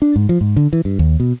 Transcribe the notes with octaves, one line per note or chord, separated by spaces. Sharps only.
D4
G#2
F3
G#2
D3
E3
G2
D#2
B2